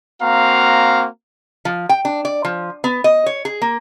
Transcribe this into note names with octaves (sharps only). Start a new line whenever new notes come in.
A#3 C4 F#4 F5 A#5
F3
G5
D4
D5
F3
B3
D#5
C#5
G#4
A#3